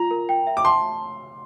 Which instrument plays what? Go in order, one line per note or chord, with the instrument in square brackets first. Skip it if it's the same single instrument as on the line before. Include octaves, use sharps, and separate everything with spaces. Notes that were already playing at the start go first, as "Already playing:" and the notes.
Already playing: [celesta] F4 [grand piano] A#5
[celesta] A#4
G5
E5
[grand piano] D6
[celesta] A5 [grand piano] C6